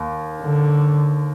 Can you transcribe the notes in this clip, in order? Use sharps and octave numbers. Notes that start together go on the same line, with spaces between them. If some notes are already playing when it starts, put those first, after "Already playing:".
Already playing: D#2
D3